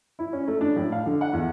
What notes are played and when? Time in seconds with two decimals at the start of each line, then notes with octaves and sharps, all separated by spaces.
0.19 E4
0.33 C#4
0.48 A3
0.61 D4
0.76 A2
0.92 F5
1.06 D3
1.21 F#5
1.33 E2